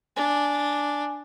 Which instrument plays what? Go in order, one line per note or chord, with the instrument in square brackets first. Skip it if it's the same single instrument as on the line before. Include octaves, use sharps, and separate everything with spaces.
[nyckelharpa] D4 [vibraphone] G#5